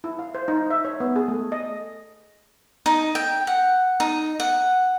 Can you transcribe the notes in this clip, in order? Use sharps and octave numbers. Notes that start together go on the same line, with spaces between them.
E4
F5
C5
D#4
E5
C#5
B3
G#4
A3
D#5
D#4
G5
F#5
D#4
F#5